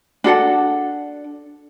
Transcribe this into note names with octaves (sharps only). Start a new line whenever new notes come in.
D4 F#4 A4 F#5